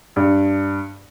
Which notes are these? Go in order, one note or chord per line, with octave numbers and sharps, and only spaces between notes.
G2